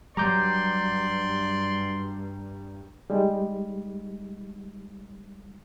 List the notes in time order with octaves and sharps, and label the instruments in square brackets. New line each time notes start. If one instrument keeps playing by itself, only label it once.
[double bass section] G2 [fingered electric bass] F#3 G3 [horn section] D5 C6 [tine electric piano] A#5 D6 G6
[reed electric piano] G3 G#3 D#4